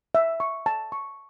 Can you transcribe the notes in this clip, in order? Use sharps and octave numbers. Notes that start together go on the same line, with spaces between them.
E5
C#6
A5
C#6